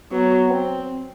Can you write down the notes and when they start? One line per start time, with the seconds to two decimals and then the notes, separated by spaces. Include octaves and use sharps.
0.12 F#3 B3
0.50 C4